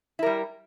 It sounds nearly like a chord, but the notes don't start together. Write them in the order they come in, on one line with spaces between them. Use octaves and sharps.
E4 A#4 G3